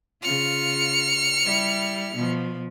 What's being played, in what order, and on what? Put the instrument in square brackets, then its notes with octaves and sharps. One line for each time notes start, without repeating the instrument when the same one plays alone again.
[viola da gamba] C#3 F4 [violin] F6 C#7
[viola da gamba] G3 E4
B2 F3